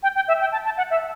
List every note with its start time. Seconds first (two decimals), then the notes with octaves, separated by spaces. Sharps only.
0.03 G5
0.15 G5
0.28 E5
0.40 G5
0.52 A5
0.65 A5
0.78 F#5
0.91 E5